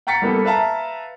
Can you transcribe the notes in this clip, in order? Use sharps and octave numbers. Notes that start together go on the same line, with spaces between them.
F#5 G5 A#5 A6 B6 C#7
G3 A#3 B3 A4
B4 E5 F5 A5 A#5